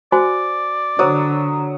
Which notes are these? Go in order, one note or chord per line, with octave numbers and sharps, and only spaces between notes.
F#4 C5 D5 G#5
D3 F#3 C5 D#6